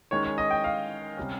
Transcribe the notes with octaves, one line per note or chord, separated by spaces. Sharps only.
D#3 G#3 C#4 C#5
C#5
D#5
G5
F5
C3 G3 C#4